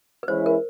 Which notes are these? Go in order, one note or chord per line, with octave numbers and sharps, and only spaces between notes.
B4
E3 G#3 C#4 E4 C5
A#4